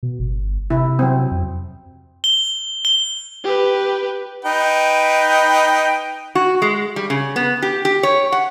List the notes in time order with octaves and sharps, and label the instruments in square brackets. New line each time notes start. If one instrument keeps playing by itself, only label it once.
[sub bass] B2
G1
[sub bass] C3 [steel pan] E4
[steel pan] F#3 C4
[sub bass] F2
[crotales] G7
G7
[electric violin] G4 B4
[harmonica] D#4 B4 G5
[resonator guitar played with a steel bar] F#4
G#3
G3
C#3
B3
G4
G4
C#5
F#5